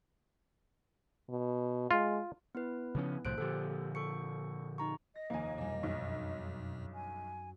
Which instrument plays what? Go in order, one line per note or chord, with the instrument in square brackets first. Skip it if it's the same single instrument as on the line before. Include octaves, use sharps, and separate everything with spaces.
[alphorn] B2
[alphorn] G#3 [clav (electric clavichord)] F4
[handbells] B3 E4 B4
[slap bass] C#3 F3 C#4
[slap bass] C2 A2 F3 [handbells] C5 F#6 D7
[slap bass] A#2 D3 F3 [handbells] G4 A4
[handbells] A4 C#6 C#7
D#4 A#5 C#6
[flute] D#5 [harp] A#6
[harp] F1 D#2 D#4 [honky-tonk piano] A#3 G#5
[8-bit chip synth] F2 B2 [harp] G3 D4
[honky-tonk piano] B1 [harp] F#2
[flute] G#5